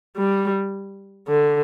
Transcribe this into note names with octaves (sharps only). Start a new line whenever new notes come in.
G3
D3